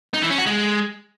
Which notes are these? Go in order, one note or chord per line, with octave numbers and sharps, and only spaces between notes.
D#4
E3
C#4
F#4
G#3